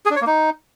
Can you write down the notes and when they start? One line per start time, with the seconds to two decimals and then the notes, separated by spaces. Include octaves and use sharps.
0.05 G#4
0.11 D4
0.16 C#5
0.21 A#3
0.27 D#4